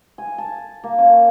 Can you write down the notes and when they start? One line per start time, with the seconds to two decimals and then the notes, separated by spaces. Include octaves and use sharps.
0.18 G#5
0.38 A5
0.84 A#3
0.98 C#4